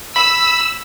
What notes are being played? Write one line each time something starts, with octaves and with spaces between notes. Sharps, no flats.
B5 E6